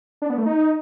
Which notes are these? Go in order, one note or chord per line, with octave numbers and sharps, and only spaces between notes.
D4
B3
A3
D#4